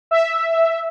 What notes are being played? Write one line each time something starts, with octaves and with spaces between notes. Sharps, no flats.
E5